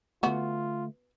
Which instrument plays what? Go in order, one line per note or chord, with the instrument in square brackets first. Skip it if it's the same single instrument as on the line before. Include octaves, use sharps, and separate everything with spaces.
[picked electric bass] D3 A3 [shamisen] B3 F#4 [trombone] F4